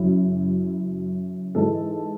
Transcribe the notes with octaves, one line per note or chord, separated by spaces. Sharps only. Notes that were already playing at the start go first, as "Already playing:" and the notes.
Already playing: F#2 C#3 F#3 E4
G#2 E3 G#3 A4